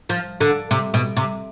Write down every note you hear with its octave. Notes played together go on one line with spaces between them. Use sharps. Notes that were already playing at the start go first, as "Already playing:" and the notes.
F3
D3
C3
B2
C3